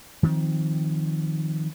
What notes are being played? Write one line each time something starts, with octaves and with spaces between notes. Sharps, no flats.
D#3 F3 A#3 C4